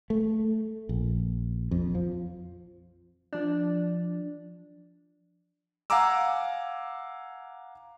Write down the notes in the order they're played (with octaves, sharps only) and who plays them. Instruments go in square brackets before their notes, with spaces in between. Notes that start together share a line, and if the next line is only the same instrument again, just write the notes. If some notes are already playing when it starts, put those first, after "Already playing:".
[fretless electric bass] A3
A#1
F2
F3
[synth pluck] F3 D4
[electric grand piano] F5 F#5 G#5 A#5 D6 E6